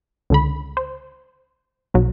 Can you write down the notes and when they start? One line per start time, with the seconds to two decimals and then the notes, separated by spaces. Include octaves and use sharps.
0.30 C#2 D3 B5
0.77 C5
1.94 B1 F#3